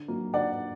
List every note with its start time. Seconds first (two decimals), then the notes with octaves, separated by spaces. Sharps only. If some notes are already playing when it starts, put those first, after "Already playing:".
Already playing: D3
0.08 F#3 A#3
0.34 D3 D5 F#5